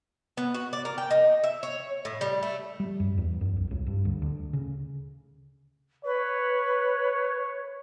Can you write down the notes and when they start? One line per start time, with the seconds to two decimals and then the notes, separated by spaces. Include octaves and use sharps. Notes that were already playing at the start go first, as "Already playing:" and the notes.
0.37 B3
0.54 F#4
0.73 D5
0.85 A#4
0.98 G5
1.11 D#4
1.44 E5
1.63 C#5
2.05 A2
2.21 G3
2.43 A3
2.80 G3
3.00 F#2
3.18 E2
3.41 F#2
3.56 B1
3.71 C2
3.86 G2
4.05 D2
4.22 D2
4.53 C#3
6.04 B4 C#5